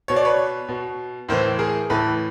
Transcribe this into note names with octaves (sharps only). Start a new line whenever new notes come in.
B2 C#5
D5
B4 C#5
B2
A2 E3 A#4 C5
G#4 A#4
A2 E3 A4 B4